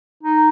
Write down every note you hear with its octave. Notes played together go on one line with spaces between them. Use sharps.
D#4